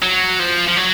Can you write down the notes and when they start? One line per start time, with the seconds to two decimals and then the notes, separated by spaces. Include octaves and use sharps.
0.02 F#3
0.39 F3
0.68 F3
0.77 F#3